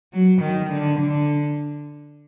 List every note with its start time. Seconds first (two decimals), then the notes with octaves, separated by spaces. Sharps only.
0.13 F#3
0.41 D#3
0.70 D3
0.99 D3